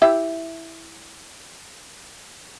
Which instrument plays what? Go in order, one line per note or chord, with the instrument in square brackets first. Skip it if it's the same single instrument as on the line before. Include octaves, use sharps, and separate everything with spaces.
[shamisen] E4 G4 E5